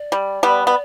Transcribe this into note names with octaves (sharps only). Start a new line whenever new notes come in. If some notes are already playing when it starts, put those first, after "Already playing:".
Already playing: D5
G3
G3 B3
B3